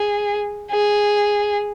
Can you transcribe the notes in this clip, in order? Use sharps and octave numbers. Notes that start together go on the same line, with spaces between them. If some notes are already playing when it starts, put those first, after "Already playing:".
Already playing: G#4
G#4